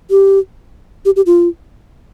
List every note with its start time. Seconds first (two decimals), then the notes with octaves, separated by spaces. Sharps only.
0.11 G4
1.05 G4
1.16 G4
1.26 F4